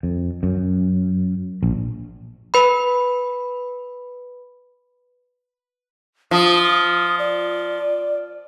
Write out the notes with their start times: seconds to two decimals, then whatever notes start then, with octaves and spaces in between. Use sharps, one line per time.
0.03 F2
0.43 F#2
1.63 A#1
2.54 B4 B5
6.31 F3 D#6
7.19 D5